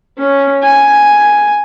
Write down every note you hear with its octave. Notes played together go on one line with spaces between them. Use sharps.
C#4
G#5